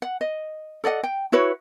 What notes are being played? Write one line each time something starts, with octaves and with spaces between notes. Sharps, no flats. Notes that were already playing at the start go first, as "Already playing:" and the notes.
F#5
D#5
A4 D5 D#5 F#5
G5
E4 F#4 B4 C#5